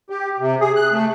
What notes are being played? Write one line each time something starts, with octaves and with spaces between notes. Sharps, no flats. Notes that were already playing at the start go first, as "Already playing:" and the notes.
G4
C3
G#4
F#6
A3